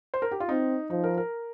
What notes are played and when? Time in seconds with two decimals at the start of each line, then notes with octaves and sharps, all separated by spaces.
0.14 C5
0.22 A#4
0.31 G4
0.40 F4
0.49 C4 D#4
0.90 F3 D#4
1.04 A#4
1.17 A#4